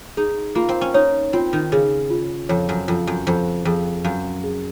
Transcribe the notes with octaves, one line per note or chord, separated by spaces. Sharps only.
D#4 G#4
A#3 F4
C4
C#4
D#4 C#5
C4 F4
D#3
C#3 G#4
F4
F2 C#5
F#2
F2 F4
F#2
F2 C5
F2 G#4
F#2 F5
G#4